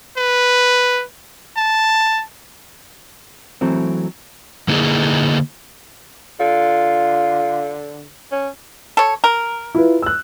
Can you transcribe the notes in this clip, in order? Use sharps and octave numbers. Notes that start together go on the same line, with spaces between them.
B4
A5
E3 F#3 A3 C4
D3 A#3 D#4 E4 G#4
D3 F4
C#4
A4 C#5
A#4
E4 F4 B4
E6 F#6